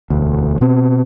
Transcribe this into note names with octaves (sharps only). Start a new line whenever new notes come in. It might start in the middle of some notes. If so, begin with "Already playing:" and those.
E1 D2
B2 C4